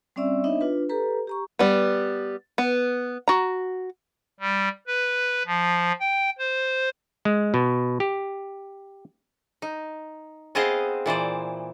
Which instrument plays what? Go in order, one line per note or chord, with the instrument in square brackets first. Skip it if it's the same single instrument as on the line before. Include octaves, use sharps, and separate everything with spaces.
[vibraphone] G3 C4 C#4 D5 E5 E6
B3 D4 D#4 C#5 D#5 E5
D4 F4 B4
G4 A4 B4 A#5
G4 A#5 C#6
[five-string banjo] G3 B3
B3
F#4 A#5
[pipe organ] G3
B4
F3
G5
C5
[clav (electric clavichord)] G#3
B2
G4
[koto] D#4
B3 C4 G#4 C5 D#5 F5
A#2 E3 C5 D5